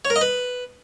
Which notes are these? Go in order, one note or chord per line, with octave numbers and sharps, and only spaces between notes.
C#5
A#4
D#5
B4